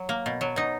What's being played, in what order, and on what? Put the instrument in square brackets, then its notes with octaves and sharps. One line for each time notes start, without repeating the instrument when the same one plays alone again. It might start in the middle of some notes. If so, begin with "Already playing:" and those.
Already playing: [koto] F#3
A#3
B2
F#3
B2 D#4